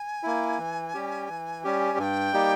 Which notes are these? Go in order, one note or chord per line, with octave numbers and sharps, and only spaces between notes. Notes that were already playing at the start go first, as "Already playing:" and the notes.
Already playing: G#5
A#3 E4
E3
G3 C#4 G4
E3
G3 C#4 G4
G2 G#5
G5
G3 A#3 D#4 G4